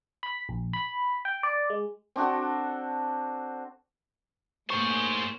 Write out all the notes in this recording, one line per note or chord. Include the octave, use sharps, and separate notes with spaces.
B5
A#1
B5
G5
D5
G#3
C4 D4 F#4 A4
A2 A#3 G#4 C5 C#6